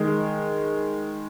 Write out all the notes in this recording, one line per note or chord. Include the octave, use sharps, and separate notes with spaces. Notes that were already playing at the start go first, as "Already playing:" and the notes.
Already playing: D#3 G#3